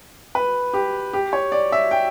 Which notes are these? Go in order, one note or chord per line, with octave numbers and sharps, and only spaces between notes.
B4
G4
G4
C#5
D5
E5
G5